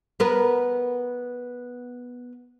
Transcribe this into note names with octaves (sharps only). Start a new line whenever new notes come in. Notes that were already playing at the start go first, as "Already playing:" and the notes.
B3 A#4 B4